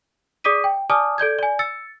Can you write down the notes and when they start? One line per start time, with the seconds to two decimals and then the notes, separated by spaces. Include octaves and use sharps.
0.44 G#4 D5 D6 D#6 B6 D#7
0.64 G5
0.90 D5 G#5 A5 D6 D#6 F6
1.18 A4 D5 G6 G#6
1.39 D5 G#5
1.59 E6 A6 C#7